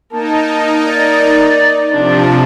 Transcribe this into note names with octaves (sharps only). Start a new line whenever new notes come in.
A#3 D#4 A5
D5
C3 F3 D4